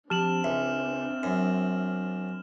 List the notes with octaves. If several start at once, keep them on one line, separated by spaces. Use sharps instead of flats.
F3 C4 D4 G4 A5 F6 E7 F#7
C#2 E5
F#2